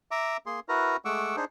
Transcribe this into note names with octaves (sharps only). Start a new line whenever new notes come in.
E5 A#5 D6
A#3 G#4 C6
E4 F#4 A#4 B4 A#5
G#3 A3 F#5 C#6 D6 E6
D4 D#4 G#4 C5